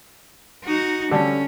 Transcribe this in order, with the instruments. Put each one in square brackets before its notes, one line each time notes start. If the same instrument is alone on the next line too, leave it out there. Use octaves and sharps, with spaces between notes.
[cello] D#4 F#4
[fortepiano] D3 G3 A3 [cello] C#4